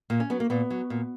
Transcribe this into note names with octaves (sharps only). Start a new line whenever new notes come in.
A#2 A#3
C#4
F#3 B3
A#3
A#2 B3
F#3
A#2